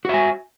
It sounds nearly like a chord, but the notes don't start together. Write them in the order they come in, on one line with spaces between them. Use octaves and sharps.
F#4 E5 G#5